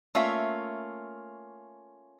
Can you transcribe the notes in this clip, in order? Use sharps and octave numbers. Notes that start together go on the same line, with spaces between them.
A3 A#3 C#4 F4 E5